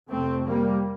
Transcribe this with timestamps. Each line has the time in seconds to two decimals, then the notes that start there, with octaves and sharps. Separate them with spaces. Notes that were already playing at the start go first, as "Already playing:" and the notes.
0.10 F2 C3 A3 C4
0.46 G3 A#3